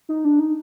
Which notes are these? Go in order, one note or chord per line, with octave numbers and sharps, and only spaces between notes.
D#4
D4
D#4